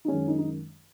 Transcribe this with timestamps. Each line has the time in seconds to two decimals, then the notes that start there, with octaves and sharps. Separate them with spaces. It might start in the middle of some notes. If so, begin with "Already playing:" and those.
0.05 D#4
0.08 F#2 D#3 G#3 C#4
0.28 D#4
0.38 D#4